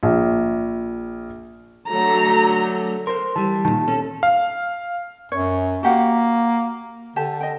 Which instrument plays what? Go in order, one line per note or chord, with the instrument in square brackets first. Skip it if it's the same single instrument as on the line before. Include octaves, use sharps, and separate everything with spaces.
[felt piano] A#1
[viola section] D3 F#3 A3 [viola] A#5
[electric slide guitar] A#4 C5 [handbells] C6
[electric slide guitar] E3 G3 [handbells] A5
[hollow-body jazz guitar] A#2 D#3 [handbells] A5
[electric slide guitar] C#4 [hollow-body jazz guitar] A4
[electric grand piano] F5
[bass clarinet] F#2 [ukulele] C#5
[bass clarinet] A#3 [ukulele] F#4 G4 F#5
[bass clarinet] D3 [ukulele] G4 A5
[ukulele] D#5 G5